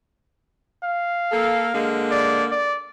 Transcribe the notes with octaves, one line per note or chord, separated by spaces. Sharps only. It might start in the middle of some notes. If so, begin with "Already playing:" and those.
F5
A#3 A4
D3 G#3 A#3
D5
D5